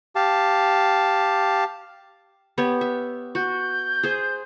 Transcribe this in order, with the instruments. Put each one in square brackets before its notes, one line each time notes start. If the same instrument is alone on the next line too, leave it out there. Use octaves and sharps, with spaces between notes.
[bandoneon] G4 F5 A5
[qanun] B3 G4 C#5
E5
[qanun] F#4 [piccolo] G6
[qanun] G#4 C5